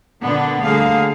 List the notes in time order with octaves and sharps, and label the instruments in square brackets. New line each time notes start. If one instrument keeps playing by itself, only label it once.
[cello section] A#2 D3 B3 D4
D2 D3 G3 A#3 G#4 F5